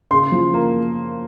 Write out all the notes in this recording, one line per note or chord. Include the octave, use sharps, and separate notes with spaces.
C#3 C6
F3
A#3